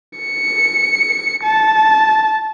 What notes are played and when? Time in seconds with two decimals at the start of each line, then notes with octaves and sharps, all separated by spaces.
0.19 C#7
1.44 A5